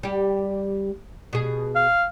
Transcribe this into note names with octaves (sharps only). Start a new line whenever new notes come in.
G3 G4
B2 G#4
F5